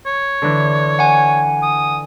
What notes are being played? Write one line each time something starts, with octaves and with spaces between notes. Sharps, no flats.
C#5
D3 E3
F#5 G#5
D#6